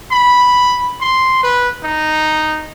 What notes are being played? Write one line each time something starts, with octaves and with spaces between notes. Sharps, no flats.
B5
C6
B4
D#4